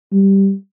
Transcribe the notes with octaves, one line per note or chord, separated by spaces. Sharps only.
G3